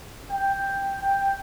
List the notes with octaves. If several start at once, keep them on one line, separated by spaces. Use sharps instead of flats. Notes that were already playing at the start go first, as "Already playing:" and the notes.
G5
G5